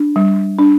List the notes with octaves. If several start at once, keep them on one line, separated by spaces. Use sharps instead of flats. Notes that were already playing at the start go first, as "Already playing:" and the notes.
Already playing: D4
G3
D4